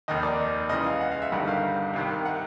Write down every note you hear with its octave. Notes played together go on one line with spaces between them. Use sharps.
F1 D#2 D#3 D#5
D5
C#2 C#3 E3 D#5
F5
F#5
F5
E5
G1 G2 D#3 G3 F#5
F5
C2 C3 D#3
F#5